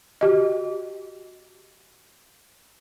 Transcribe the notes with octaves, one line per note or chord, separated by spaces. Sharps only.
F#4 G4 D#5